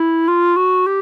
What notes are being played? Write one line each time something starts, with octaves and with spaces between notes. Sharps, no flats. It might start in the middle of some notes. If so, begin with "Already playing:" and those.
Already playing: E4
F4
F#4
G4